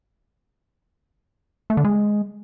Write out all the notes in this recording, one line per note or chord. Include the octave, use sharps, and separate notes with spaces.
A3
D3
G#3